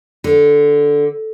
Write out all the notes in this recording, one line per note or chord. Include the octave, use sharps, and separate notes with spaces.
D3